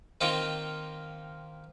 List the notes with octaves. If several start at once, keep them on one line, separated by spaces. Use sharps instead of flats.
D#3 A#3 C4 D#4 F4 G4